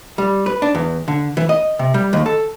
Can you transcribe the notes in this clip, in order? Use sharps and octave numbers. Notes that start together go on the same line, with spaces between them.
G3
B4
D4
E2
D3
E3
D#5
C3
G3
D#2
A4